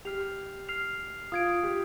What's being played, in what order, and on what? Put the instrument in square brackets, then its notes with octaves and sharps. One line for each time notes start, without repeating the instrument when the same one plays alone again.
[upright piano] G4 [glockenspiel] F6 C7 F7
[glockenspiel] F6 C7 F7
[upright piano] F4 [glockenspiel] D#6 G#6 D7
[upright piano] G4